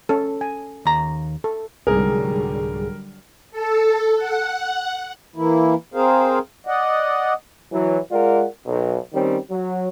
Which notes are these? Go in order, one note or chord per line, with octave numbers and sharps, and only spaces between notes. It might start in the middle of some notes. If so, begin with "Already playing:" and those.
C#4 A4
G#5
D#2 A#5
A4
C2 G#2 D3 F#3 G3 G#4 A#4
A4
F#5
E3 A#3 E4
C4 G#4 A#4 C5 F5
D5 D#5 F#5
E3 F#3
G#3 F4 A#4 D5 F#5
B1
D#3 G3 C4 C#4
F#3